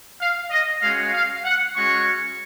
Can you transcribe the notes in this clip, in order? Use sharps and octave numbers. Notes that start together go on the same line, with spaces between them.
F5
D#5
G#3 C#4 F#4 F5
F5
F#5
G#3 C#4 F#4 C#6